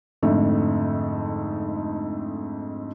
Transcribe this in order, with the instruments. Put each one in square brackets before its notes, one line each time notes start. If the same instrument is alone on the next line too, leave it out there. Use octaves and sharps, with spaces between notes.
[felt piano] F2 G#2 D3 A3